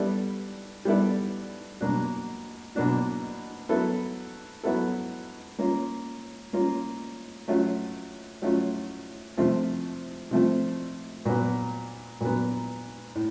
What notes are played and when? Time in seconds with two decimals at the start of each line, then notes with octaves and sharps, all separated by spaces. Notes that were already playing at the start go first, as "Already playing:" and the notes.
Already playing: G3 B3 E4 A4 D5
0.85 G3 B3 E4 A4 D5
1.80 B2 F#3 A#3 D4 F#4
2.75 B2 F#3 A#3 D4 F#4
3.69 F#3 B3 E4 A4
4.63 F#3 B3 E4 A4
5.59 A#3 C#4 F4
6.53 A#3 C#4 F4
7.48 F#3 A3 C#4 F4
8.42 F#3 A3 C#4 F4
9.37 C3 F3 A3 C4 F4
10.31 C3 F3 A3 C4 F4
11.25 A#2 F#3 B3
12.21 A#2 F#3 B3
13.15 A2